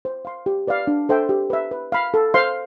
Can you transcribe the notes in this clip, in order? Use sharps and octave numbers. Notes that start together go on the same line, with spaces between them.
C5
F5 C6
G4
B4 D5 F5
D4
A4 C5 E5 G5
G4
B4 E5
B4
F5 B5
A4
C5 F5 C6